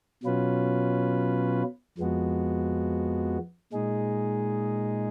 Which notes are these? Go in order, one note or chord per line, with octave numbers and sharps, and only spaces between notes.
B2 F#3 C#4 F4 B4
F2 F3 G#3 B3 F#4
A#2 G#3 D#4 G#4